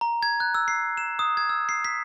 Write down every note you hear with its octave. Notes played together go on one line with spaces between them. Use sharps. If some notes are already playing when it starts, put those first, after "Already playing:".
A#5
G#6
F#6
E6
C7
E7
D#6
G#6
E6
C7
B6